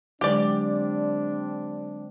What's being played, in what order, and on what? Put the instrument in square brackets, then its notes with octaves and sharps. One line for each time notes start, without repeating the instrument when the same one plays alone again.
[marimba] D3 F#3 G#3 [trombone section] C4 D4 [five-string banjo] G4 D5